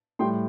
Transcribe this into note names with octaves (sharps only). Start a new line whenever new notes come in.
A2 G3 G5 C6